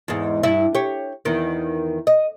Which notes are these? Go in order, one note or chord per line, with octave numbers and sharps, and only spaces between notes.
E2 G#2
G2 E4
G4 C#5
E2 D#3
D#5